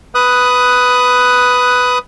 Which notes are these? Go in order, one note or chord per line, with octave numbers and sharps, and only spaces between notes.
B4 D#6 F#6